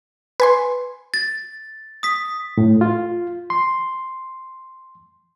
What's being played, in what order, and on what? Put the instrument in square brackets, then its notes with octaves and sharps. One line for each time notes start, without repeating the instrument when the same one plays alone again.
[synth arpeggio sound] B4 G#5 C6
[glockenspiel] A6
D#6 B6
[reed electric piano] A2
F4
C6